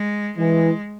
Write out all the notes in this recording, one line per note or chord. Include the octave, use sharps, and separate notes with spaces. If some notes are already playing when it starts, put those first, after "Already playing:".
Already playing: G#3
E3 G#3